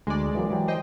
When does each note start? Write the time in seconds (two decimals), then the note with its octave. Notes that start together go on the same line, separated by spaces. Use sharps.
0.07 D2 G#3 D5
0.35 E3 F#3 A#3
0.51 E3 F#3 G4
0.68 C5 D#5 G5